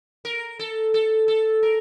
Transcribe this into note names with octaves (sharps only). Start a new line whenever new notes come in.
A#4
A4
A4
A4
A#4